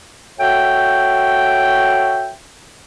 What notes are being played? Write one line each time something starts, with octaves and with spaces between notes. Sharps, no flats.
F#4 A4 C#5 E5 G5